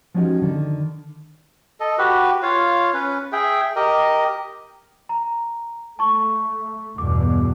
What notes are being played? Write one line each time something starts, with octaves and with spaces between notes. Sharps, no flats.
F3 G#3 C#4 D#4 F#4 G4
D3 D#3
A4 D#5
F#4 G4 B4
F4 C#5 F5
C#4 B4
G#4 E5 G5
G4 A#4 D#5
A#5
A3 A5 C#6
E2 G2 B2 D6